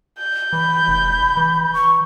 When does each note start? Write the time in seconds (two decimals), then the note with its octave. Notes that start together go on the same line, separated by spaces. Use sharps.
0.19 G6
0.53 E3 B5
0.88 F1
1.37 E3
1.73 C#6